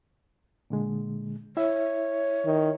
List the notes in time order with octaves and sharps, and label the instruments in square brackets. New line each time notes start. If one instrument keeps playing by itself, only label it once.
[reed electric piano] A#2 D3 G#3
[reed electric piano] E4 E5 [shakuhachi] C#5
[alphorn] D#3